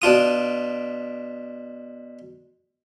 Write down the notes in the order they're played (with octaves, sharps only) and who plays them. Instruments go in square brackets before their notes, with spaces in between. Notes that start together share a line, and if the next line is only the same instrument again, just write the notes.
[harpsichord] B2 D4 F4 D#6